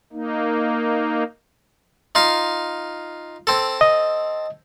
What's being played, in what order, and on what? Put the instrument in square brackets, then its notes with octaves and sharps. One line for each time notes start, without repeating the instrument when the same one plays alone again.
[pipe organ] A#3 D#4
[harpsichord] D#4 F4 F5
C4 A4
[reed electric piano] D#5